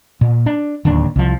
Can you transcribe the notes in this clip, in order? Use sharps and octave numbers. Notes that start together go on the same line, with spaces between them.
A#2
D4
D1 D#2 D4
C2 F3